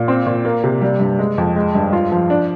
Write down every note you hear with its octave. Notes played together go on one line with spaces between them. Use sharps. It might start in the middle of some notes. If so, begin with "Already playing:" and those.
Already playing: A#2
C4
A#2
A#3
C3
G3
G2
G#3
F2
G#3
G2
F4
F3
D4